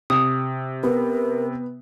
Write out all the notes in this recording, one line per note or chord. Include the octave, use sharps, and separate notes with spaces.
C3 D#6
B3 A#4